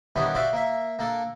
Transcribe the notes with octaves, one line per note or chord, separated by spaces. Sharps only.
D#3 G3 B3 C#4 D4 E4
F#4 C5 D5 E5 F5
A#3 E5
A#3 D4 A4